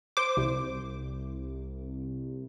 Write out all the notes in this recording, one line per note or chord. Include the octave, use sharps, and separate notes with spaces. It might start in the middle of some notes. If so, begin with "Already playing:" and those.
C5 D6
C2